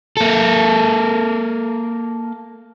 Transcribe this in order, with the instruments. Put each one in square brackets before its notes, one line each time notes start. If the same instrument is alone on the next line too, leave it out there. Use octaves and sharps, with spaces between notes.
[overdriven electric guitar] A#3 A4